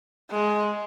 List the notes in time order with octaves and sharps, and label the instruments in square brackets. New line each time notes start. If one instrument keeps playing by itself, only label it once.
[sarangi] G#3